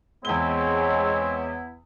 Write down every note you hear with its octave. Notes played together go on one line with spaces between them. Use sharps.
E2 G#3 B3 C4 E4 C#5 G7